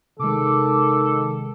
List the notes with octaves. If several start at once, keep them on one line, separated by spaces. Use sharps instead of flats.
C3 D#3 G#3 A4 D6